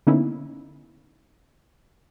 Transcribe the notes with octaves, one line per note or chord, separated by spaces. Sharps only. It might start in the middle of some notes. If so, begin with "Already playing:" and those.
D3 A#3 B3 C#4 D#4 E4